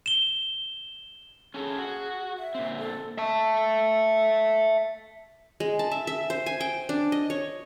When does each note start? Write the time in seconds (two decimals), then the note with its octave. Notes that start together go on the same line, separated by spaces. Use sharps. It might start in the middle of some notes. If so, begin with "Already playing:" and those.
0.06 E7 G7
1.54 C#4 G#4 A4
1.78 F#4
2.38 E5
2.55 A#2 C4
2.78 A4
3.18 E5 A5
5.60 G#3
5.79 A5
5.92 E5
6.07 E5
6.30 C5
6.46 G#5
6.61 G5
6.89 D4
7.12 D#5
7.30 C#5